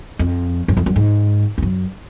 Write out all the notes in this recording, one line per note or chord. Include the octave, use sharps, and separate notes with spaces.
F2
F#2
F2
F#2
G#2
F2
F#2